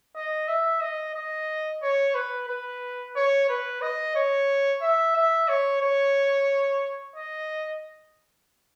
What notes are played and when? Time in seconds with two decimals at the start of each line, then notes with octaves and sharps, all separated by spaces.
0.16 D#5
0.48 E5
0.81 D#5
1.15 D#5
1.82 C#5
2.15 B4
2.49 B4
3.16 C#5
3.49 B4
3.82 D#5
4.16 C#5
4.82 E5
5.16 E5
5.49 C#5
5.82 C#5
7.16 D#5